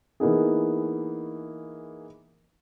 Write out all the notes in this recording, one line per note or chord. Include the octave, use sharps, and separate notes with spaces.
E3 A#3 B3 D#4 G#4